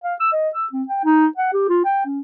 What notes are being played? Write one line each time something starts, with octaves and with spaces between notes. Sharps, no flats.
F5
E6
D#5
E6
C4
G5
D#4
F#5
G4
F4
G5
C#4